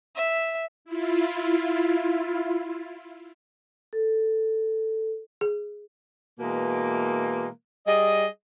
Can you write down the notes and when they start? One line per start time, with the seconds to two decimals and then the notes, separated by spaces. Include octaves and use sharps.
0.16 E5
0.85 E4 F4
3.93 A4
5.41 G#4
6.40 B2 E3 G#3 A#3
7.87 G3 G#4 D#5